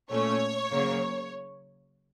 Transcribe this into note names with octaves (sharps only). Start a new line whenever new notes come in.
A#2 A3 C#4 C#5
C#3 F#3 A#3